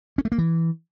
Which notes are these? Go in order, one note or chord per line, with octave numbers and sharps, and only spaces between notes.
C#4
A3
A#3
E3